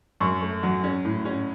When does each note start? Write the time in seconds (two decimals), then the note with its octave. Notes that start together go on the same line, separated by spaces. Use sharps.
0.21 F#2 C#6
0.42 A3
0.63 F#3
0.84 C#4
1.05 A2
1.25 C#4